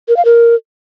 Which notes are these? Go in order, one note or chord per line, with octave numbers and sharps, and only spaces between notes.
A#4
F5
A#4